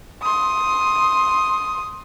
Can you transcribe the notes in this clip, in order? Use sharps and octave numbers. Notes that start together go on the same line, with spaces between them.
C6 D#6